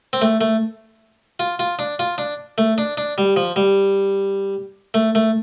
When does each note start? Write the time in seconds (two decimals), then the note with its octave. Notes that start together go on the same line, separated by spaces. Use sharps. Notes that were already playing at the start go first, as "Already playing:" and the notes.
0.13 C4
0.22 A3
0.41 A3
1.40 F4
1.59 F4
1.79 D4
1.99 F4
2.18 D4
2.58 A3
2.78 D4
2.97 D4
3.18 G3
3.36 F3
3.56 G3
4.94 A3
5.15 A3